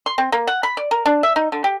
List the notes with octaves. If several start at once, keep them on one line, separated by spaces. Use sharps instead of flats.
C6
C4
A#3
F#5
B5
D5
A#4
D4
E5
D#4
D3
G4